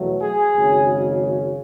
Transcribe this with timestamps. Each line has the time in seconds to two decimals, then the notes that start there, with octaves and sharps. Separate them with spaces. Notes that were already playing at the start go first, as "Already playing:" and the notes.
Already playing: E2 B2 F#3 A3
0.21 G#4
0.55 G#1 F#2 C#3